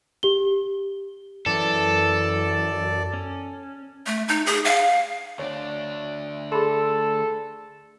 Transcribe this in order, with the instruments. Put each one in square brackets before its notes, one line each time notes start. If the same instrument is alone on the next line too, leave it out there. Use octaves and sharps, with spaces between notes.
[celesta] G4 G7
[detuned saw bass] F#2 [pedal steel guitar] E3 [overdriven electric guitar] A4 [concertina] D5
[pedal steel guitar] C#4
[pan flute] A3
D#4
G#4
F5
[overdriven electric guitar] D2 D4 [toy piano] C#5
[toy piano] G#4 B5 C6 [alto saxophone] A4